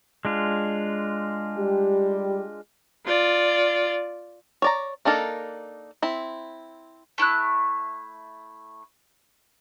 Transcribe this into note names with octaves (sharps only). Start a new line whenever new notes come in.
G#3 D4 F4
G3 G4
F4 D5
C#5 D5 A#5
A#3 D4 D#4 A4 A#4
C4 E4
A3 E4 E6 F#6